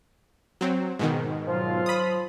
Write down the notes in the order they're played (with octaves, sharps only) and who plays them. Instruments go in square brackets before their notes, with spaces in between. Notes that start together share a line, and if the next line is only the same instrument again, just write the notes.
[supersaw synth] F#3 C4
G#2 B2 D#3
[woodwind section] F3 F#3 F4
[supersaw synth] B5 D#6